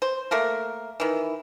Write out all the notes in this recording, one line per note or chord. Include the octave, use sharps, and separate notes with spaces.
C5
A3 A#3 A#4
D#3 E3